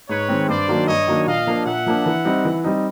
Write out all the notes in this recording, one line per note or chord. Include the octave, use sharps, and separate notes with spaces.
G#2 B4 C#5
D#3 G#3 C4
G2 C5 D5
D#3 F#3 A#3 D4
G2 C#5 D#5
D#3 F#3 A#3 D4
A#2 D#5 F5
F3 A#3 D4
A#2 E5 F#5
F3 A#3 D4
E3
G3 C4 D#4
E3
G3 C4 D#4